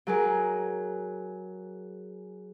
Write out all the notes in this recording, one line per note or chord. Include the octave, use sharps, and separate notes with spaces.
F#3 G#4 A#4